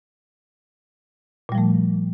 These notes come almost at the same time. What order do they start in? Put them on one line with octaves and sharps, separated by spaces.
A#2 G3 F3 A3